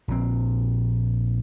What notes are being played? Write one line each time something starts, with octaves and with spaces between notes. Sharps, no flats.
A#1 A#2 C4